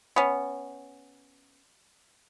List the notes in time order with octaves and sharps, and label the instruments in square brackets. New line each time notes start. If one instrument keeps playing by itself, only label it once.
[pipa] B3 C#4